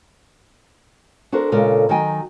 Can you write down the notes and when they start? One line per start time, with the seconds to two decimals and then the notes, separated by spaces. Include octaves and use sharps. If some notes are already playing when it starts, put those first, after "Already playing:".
1.32 D4 F#4 A4 A#4 C5
1.52 A#2 C#3 G#3 A4 A#4 D5
1.89 D#3 F#3 D#4 D#5 G5 G#5